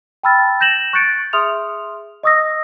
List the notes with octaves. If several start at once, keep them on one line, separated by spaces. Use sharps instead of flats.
G5 A5 B5 E6 F6 A6
G6 A#6 E7 F#7
C#6 F#6 G6 A6 C#7 D7
G#4 E5 C6 D#6 F6 F7
D#5 C#6 D#6 E6 A#6